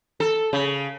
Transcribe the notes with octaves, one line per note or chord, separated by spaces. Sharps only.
A4
C#3